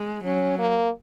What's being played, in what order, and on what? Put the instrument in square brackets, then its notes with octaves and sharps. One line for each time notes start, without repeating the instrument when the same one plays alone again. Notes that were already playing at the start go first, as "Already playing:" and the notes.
Already playing: [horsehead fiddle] G#3
[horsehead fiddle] F#3 [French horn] C#4
[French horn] A#3